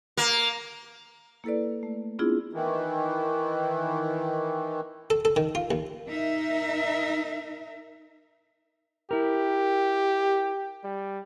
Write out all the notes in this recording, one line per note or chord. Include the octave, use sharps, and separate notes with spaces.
A#3
A#3 E4 A4 B4 D5
A3
B3 C4 D4 E4 F4 G#4
D#3 E3
A4
A4
D#3
F4
D#2
D#4 A#4 E5
E4 G4 A#4
G3